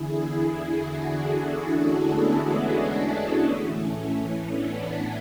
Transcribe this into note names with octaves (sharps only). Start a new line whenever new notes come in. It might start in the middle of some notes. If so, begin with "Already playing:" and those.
Already playing: E2 D3 E4 G#4
D4 F#4
F#4 A4
A3 C#4
G#3 B3
G#3 B3
A3
G#3 B3
A2 E3 A3 C#4
B3 D4